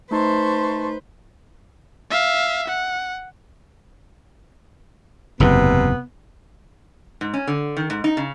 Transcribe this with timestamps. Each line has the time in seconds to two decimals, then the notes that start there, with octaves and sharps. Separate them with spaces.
0.11 A3 D#4 B4 C5 A5 C6 C#6
2.11 E5 F5
2.68 F#5
5.40 F#1 E2 G#2 C3 B3
7.21 G#2
7.34 C#4
7.48 D3
7.77 D#3
7.90 G#2
8.04 D#4
8.17 C#3